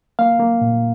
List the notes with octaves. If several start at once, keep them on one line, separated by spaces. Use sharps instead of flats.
A#3 F5
A#3
A#2